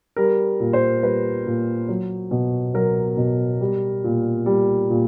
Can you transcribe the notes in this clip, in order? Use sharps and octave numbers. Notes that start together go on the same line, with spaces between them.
G3 A#4
A#2
C5
G3 B4
A#2
F#3
B2
F#3 A#4
B2
G3
A#2
G3
A#2